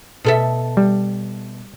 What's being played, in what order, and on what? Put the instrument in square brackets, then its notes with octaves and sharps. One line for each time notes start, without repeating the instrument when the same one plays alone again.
[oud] B2 A4 E5
[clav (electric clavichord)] G3